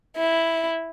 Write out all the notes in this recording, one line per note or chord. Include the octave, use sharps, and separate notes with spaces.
E4